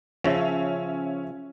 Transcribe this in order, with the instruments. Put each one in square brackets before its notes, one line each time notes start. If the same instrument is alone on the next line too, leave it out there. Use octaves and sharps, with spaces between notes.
[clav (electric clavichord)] C#3 F3 [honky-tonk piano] C#4 E5